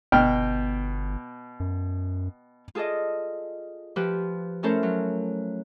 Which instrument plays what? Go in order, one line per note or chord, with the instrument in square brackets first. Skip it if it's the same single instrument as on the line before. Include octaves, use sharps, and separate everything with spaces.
[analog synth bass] G1 [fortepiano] B2 G5 F6
[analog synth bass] F#2
[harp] F4 G#4 A4 D5 D#5
F3 G4 B4
A3 C#4 E4 A4 A#4 C5
F#3